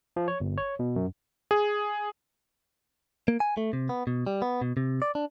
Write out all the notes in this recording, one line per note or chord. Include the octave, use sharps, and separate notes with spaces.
F3
C#5
G1
C#5
B2
F#2
G#4
A#3
G#5
A3
C3
B3
B2
G3
B3
B2
C3
D5
D4